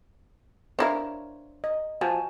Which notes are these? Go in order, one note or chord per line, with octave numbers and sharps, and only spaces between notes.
D4 E4 A#4 C5 C#5 F5
D#5
F3 F#4 G#5 A5